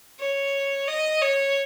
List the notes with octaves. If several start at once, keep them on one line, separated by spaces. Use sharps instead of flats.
C#5
D#5
C#5